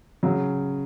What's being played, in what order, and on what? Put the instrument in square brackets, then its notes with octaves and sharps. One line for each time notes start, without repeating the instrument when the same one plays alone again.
[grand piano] C#3 [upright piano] F#3